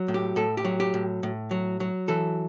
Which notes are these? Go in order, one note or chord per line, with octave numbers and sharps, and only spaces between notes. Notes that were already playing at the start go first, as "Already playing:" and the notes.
Already playing: F#3
A2
G4
A2 A4
G4
F#3
G4
A2
A2
F#3
F#3
E3 A4